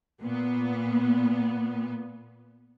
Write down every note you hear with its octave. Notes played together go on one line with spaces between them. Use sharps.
A#2 B3